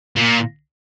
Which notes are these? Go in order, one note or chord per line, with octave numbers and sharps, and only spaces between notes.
A#2